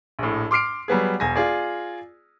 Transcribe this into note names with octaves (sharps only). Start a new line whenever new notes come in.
A#1 A2
C6 D6 F6 C7 D7
F#3 G3 B3 G#4
E1 G#5 A#6
F4 G#4 D5